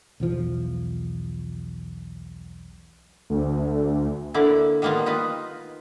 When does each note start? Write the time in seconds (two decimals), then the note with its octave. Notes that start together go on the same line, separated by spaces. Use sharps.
0.20 B1 E2 F3
3.30 D2
4.34 D3 A#3 E4 D5
4.82 D#3 G3 A#3 B3 F4
5.06 D#4 F4 B4